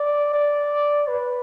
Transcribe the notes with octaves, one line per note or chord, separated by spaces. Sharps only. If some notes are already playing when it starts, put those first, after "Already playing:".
Already playing: D5
D5
B4